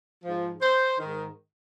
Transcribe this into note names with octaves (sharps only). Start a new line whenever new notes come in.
G#2 F3
C5
G#2 D#3